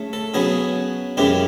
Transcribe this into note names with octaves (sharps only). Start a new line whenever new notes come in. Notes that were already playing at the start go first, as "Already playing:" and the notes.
Already playing: C#3 A3
A4
C#3 F#3 B3 G#4
F#2 C#3 E3 G#3 G4